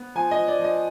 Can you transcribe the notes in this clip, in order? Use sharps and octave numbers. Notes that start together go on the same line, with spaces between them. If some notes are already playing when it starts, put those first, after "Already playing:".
Already playing: B3
F3 G#5
D#5
F3
D5
F3
D#5